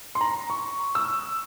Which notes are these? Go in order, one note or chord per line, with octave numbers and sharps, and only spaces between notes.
C6
A#5
C#6
E6